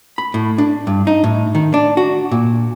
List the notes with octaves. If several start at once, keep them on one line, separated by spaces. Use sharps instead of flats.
B5
A2
D4
G2
D#4
A2
D#3
D4
F#4
A#2